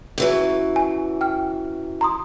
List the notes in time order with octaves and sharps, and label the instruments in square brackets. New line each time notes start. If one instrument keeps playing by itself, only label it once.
[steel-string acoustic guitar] F#2 E3 F#3
[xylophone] G#5
G5 F6
A#5 C6 D#6